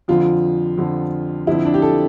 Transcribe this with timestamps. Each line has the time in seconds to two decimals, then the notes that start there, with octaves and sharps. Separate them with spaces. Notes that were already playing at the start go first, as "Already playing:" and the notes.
0.08 F2 D3 F3 F4
0.77 F2 D3 F3
1.47 F2 D3 F3 E4
1.65 D4
1.74 G4
1.82 A4